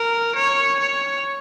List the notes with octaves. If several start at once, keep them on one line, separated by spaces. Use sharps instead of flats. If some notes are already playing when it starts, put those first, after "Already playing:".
Already playing: A#4
C#5
C#5